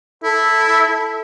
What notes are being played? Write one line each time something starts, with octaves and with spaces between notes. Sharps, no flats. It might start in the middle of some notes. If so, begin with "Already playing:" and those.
E4 A4